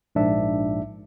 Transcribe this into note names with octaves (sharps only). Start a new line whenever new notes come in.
A#1 G#2 D4 E5